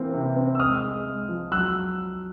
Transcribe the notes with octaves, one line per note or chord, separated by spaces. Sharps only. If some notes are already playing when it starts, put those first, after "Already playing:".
Already playing: E3 A#3 C4
C3
C4
E6
G#3 D#6 F6
G#3
G#3
F3
F#3 E6 F#6